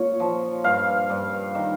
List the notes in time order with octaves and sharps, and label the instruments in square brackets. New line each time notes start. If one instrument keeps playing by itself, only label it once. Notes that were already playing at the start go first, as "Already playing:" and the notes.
Already playing: [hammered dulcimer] A#2 C#5
F3
G2 F5
G2
D#3